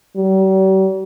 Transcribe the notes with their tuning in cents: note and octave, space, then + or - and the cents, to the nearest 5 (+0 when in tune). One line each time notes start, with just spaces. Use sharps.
G3 -45